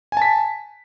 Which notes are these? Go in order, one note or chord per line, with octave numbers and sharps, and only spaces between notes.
G#5 A5 B6